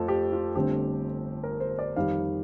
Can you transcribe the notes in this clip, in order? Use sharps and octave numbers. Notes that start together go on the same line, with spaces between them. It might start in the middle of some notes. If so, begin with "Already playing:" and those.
Already playing: F2 A3 F4 A4
G4
F4
G1 G2 D3 A3 C4 G4
A#4
C5
D5
F2 D#3 G3 F5